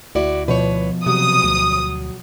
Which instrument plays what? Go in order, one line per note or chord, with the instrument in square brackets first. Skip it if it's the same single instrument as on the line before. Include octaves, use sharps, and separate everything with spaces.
[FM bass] D2 [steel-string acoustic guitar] E4 F#4 D5
[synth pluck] B2 F3 [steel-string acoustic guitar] B4 C#5
[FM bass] C3 [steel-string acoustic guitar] F#3 [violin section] D#6
[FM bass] D2